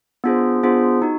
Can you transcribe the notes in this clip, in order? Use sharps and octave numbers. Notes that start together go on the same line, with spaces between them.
B3 D4 F4 G#4 C5
B3 D4 F4 G#4 C5
D#4 F#4